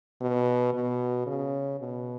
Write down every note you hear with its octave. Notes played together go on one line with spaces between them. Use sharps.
B2
B2
C#3
B2